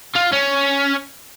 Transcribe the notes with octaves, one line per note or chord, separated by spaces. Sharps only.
F4
C#4